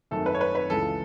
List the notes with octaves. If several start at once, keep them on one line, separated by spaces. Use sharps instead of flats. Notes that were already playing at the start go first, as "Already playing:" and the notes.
G#1 F#2 D#3 A3 A4
B4
C#5
B4
B4
C#2 C#3 E3 G#3 A4